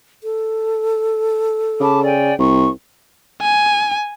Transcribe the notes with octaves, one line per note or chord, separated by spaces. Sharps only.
A4
C#3 A5 B5 D6
D5 G5 G#5
C2 C#6
G#5